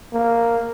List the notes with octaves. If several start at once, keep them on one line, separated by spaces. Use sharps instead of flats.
A#3